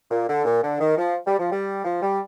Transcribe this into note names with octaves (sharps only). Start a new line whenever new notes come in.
A#2
D3
A#2
D3
D#3
F3
G3
F3
G3
F3
G3